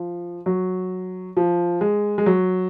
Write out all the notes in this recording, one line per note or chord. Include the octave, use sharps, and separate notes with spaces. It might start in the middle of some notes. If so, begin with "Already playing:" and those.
Already playing: F3
F#3
F3
G#3
G#3
F#3